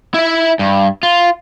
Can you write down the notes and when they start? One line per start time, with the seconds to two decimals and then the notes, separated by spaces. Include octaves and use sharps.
0.14 E4 E5
0.59 G2
1.03 F4